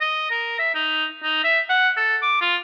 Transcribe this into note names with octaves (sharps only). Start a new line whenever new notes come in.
D#5
A#4
E5
D#4
D#4
E5
F#5
A4
D6
F4